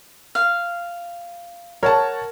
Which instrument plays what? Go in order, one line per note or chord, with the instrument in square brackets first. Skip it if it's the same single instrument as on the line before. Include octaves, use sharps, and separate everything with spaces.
[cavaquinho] F5
[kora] A#4 [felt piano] C#5 F#5 A5